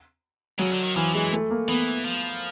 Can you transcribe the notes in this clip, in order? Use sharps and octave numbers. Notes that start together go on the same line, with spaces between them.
C#3 F#3
D3
D#3
E3 F3
E3 G#3
A3
A#3
E3 B3
F3